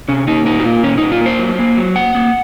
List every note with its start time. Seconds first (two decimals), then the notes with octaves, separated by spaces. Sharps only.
0.08 C3 C#4
0.27 A#3 D#4
0.46 A#2 D#4
0.60 F#4
0.64 A#3 F4
0.83 A#2 C#4
0.98 A#2 D#4
1.12 F4
1.21 A#3 C5
1.39 F#3
1.59 A#3
1.77 F#3
1.96 A#3 F#5
2.15 A#3